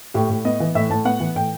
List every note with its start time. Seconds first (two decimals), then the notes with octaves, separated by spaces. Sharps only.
0.14 A2 G4
0.30 A2
0.45 B3 D#5
0.60 E3
0.75 A2 E5
0.90 A2 A5
1.05 B3 F#5
1.20 E3
1.35 A2 G5